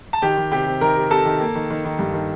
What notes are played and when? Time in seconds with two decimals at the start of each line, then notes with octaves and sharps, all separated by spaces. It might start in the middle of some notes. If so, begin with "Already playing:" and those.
0.13 A5
0.22 D#3 G4 G5
0.37 D#3
0.51 C3 G4 G5
0.66 C3
0.81 D#3 A#4 A#5
0.96 C3
1.11 C3 A4 A5
1.26 D#3
1.40 A#3
1.55 D#3
1.70 D#3
1.85 D#3
1.99 G2
2.14 D#3